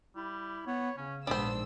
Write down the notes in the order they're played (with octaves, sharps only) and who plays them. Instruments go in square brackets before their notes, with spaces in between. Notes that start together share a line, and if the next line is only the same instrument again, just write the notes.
[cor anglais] G3 [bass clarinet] E4
[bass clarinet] B3 [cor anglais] C#5
[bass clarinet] C#3 [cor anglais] C#4
[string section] A#1 G#2 E6 [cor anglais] B3 [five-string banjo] D4 C5